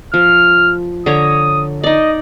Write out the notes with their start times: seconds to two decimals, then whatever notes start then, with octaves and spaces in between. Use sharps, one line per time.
0.14 F3 F6
1.06 D3 C#5 A#5 D#6
1.83 D#4 D5 D#5